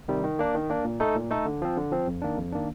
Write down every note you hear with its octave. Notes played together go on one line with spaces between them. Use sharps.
C3 D#3 G3
D#3
A#3 D4
D#3
A#3 D4
A#2
A3 D#4 A4
A#2
A3 D#4 A4
D3
F3 C4
D3
F3 C4
F2
D#3 A#3 D4
F2
D#3 A#3 D4